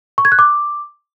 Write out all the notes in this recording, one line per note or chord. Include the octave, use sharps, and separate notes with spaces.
C#6
G#6
F#6
D6